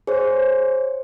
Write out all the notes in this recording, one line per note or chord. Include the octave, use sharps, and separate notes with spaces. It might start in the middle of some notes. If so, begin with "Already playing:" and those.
G#4 C5 C#5